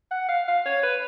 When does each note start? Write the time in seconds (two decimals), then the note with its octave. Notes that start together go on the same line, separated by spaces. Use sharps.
0.11 F#5
0.29 F5
0.48 F5
0.66 C#5
0.83 B4